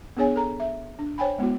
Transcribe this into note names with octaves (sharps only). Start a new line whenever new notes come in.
B3 D4 G#4 C#5 G#5
A4 A#5
E5
D4
C5 C#5 G5 G#5 B5
G#3 B3 E4 F#4